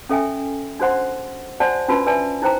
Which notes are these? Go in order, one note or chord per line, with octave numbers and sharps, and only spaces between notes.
C#4 A4 E5 G5 G#5
D4 F#4 C5 F#5 C6
F#4 C5 D5 F#5 G#5 A5
C#4 D4 F4 F#4 B4 A5
B4 D5 E5 G#5 A5
D#4 E4 C5 G5 A#5